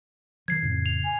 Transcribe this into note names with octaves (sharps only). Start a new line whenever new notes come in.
D#3 F3 G#6 C7
F2 A2 C#3
F7
G#5